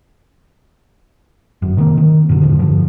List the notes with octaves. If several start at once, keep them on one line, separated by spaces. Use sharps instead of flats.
G1 F#2
C3 D#3 F3 A#3
D#3
F#2 B2 D3
E2 G#2 D3 F3
G#1 G2 D3 F3